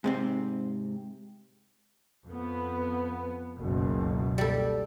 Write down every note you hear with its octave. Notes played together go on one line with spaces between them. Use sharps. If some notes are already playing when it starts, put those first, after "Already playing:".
G#2 C3 C4
F2 B3
F#1 C#2 B2
G3 A4